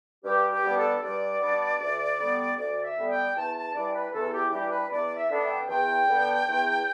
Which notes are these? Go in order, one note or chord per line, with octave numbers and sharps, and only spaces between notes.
G2 G4
G4
G3 B3 D4
A4
G2 D5
G3 B3 D4
D2
D3 G3 B3
D2 D5
E5
D3 G3 B3
G5
E2 A5
A5
E3 G3 D4 D5
B4
E2 A4
G4
E3 G3 D4 G4
B4
E2 D5
E5
D3 B3 D4
E5
G5
E2 G5
D3 B3 D4
E2